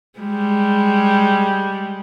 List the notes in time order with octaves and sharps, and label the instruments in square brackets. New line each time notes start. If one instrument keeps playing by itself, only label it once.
[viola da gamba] G3 G#3